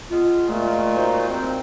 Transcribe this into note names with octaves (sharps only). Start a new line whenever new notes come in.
G#3 B3 F4
A#2 G#3 A3
D#4 F#4 C5
C4